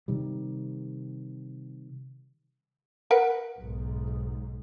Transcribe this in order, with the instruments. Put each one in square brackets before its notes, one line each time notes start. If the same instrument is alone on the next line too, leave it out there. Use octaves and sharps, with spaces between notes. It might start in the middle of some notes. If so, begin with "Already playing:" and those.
[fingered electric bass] C3 D#3 G3
[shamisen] A#4 B4 F#5
[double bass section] B1 G#2